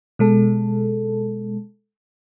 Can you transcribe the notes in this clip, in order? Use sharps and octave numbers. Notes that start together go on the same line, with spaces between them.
B2 G#3 A4